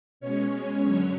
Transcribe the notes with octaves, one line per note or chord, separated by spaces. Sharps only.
B2 G#3 C#4 C#5
F#2 D3 F#3